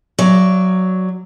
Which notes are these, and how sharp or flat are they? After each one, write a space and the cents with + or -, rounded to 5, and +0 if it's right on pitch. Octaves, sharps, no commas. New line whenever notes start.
F#3 +0 D5 +0 F5 -45